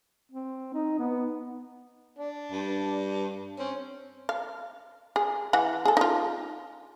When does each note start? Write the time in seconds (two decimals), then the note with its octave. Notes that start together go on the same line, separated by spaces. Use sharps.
0.32 C4
0.74 D#4
0.99 B3
2.19 D4
2.52 G2
3.59 C4 C#4
4.29 F5
5.16 G#4
5.53 E3 F#5
5.85 G#4 A4
5.97 D#4 F4